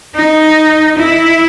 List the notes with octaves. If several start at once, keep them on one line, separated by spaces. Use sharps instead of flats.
D#4
E4